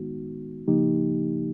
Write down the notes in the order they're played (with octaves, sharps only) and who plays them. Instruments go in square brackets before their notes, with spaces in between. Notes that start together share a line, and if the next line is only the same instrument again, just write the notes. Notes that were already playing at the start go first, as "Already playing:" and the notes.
Already playing: [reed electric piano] D#3 G#3 B3 D#4 F#4
C#3 F3 A#3 D#4 G4